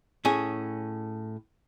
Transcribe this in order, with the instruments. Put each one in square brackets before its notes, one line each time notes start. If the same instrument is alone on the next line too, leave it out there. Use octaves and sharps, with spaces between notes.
[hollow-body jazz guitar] A2 C#4 G#4